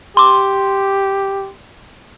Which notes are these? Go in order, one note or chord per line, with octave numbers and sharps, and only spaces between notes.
G4 C6 D6